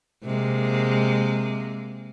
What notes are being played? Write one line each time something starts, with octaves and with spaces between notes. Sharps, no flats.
C3 G#3 A#3